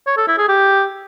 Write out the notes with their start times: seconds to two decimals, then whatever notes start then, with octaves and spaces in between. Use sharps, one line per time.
0.07 C#5
0.17 A4
0.27 E4
0.38 G#4
0.48 G4